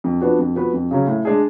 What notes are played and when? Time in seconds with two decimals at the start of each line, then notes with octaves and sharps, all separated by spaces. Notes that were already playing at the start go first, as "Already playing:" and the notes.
0.04 F2
0.21 F3 B3 D4 F#4
0.39 F2
0.56 F3 B3 F#4 B4
0.73 F2
0.91 C#3 F#3 C#4
1.08 A2
1.25 G#3 D4 G#4